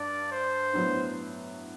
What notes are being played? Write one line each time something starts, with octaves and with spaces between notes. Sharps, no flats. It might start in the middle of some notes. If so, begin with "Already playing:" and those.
Already playing: G2 D5
C5
A2 F#3 B3 D4